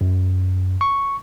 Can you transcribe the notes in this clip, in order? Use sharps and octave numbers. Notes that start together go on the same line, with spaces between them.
F#2
C#6